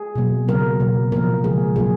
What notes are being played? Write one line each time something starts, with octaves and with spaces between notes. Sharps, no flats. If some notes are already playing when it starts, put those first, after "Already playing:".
Already playing: G#4
B2 F#3 A#3
C#3 F#3 A#3 A#4
B2 F#3 A#3
A#2 F3 A#3 A#4
C#3 F3 G#3 G#4
A#2 F#3 A#3 G#4